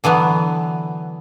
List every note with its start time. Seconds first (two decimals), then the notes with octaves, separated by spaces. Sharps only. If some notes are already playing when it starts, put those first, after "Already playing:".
0.04 D3 E3 F#3 B3